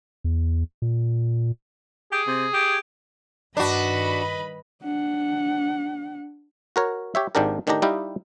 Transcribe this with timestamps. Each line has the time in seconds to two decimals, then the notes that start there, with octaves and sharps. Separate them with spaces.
0.24 E2
0.82 A#2
2.12 G4 G#4
2.27 C3
2.54 G4
3.57 G2 D#3 D4 F#4 B4 D#5 B5
4.82 D4 F#5
6.76 F#4 A#4 C#5
7.15 G4 C#5 E5
7.35 G#1 G#2 D4 G4 A#4
7.67 A2 D#3 D4 D#4 G4 A#5
7.82 G3 D#4 E4 G4 D#5 F5